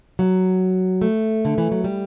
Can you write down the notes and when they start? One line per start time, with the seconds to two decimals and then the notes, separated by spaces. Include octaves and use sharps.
0.19 F#3
1.01 A3
1.45 D3
1.58 E3
1.72 F#3
1.84 G3